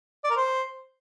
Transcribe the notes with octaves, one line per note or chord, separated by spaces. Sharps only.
D5
A#4
C5